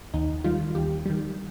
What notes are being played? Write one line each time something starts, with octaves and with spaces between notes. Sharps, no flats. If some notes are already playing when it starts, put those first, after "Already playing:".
D#2 D#4
D#3 G3 F4
D#2 G4
D#3 G3